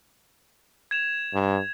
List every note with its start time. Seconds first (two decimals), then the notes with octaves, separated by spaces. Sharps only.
0.91 G#6 E7 F7
1.33 G2